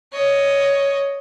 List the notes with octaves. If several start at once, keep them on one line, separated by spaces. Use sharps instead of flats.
C#5 D#5